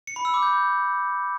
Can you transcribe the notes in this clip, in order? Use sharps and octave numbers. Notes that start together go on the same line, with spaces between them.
C#7
B5
E6
D6
G6